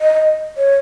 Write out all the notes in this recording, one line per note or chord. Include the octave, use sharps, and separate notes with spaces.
D#5
C#5